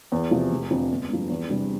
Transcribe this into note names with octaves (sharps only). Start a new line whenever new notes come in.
E2
C3 F3
F1
F2 D3 F3
G1
G2 F3
E2
C3 G3 D4